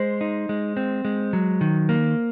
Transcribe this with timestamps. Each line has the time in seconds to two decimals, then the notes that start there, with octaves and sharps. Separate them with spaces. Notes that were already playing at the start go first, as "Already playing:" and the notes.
Already playing: G#3 C5
0.21 D#4
0.49 G#3
0.77 C4
1.05 G#3
1.33 F#3
1.61 D#3
1.89 A#3